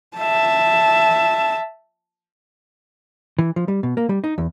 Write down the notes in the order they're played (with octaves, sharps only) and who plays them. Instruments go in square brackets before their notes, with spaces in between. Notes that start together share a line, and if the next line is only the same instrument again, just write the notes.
[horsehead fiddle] E5 A5
[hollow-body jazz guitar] E3
F3
G3
B2
A#3
G3
D#4
E2